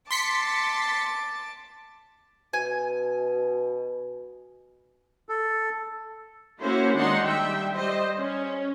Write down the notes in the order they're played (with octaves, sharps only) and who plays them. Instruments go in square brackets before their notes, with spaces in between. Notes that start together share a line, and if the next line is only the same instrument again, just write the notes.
[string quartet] A5 D6 [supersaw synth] C6 B6 C#7
[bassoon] B2 [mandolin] G#5
[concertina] A4
[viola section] A#3 C#4 E4 F#4 C5
D#3 G#3 D4 D#4 F#5 C6
G3 E5 G5
G3 C5 D#5
C#4